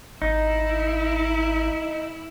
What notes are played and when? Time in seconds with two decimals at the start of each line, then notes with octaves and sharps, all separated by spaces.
0.22 G#1 D#4 E4